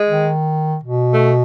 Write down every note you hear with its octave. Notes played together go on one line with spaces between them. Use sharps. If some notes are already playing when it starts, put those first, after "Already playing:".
Already playing: G#3
D#3
B2
A3